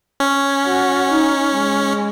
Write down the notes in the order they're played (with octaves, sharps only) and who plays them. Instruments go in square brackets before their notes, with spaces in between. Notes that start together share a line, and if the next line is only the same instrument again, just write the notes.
[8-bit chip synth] C#4
[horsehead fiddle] F#4
D#4
G#3